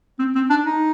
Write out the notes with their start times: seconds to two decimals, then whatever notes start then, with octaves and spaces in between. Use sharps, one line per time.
0.19 C4
0.35 C4
0.50 D4
0.66 D#4